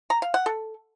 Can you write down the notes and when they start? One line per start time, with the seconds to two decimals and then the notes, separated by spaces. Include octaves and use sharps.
0.10 A#5
0.22 F5
0.34 F#5
0.46 A4